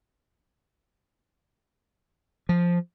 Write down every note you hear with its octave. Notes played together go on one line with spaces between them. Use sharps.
F3